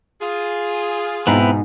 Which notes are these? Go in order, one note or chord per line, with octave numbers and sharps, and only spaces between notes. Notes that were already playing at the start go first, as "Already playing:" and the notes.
F4 G#4
G#2 B2 B3 C4 D#4 E4